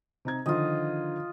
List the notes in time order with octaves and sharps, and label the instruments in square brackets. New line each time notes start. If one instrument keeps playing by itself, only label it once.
[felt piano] C3 D#4 G#6
[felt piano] D3 D#3 F3 [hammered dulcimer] F4 D#5